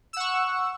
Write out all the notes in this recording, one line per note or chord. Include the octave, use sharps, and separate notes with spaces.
F#5 C#6 E6